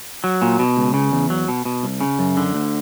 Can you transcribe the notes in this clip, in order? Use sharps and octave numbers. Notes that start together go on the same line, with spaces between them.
F#3
A#2
B2
C#2
C#3
E2
F#3
B2
B2
C2
C#3
F#2
D3
D2